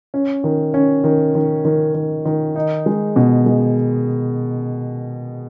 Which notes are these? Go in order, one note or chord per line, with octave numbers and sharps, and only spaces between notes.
C#4
D#3
C#4
D#3
D#3
D#3
D#3
D#3
D#4
G#3
B2
G#3